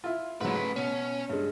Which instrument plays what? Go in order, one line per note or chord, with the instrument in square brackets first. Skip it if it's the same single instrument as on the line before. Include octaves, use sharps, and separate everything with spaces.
[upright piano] E4 F4
[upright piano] G#2 F#3 [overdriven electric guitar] A3 B4
[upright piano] B6
[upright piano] B2 [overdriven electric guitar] C#4
[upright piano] G2 G#3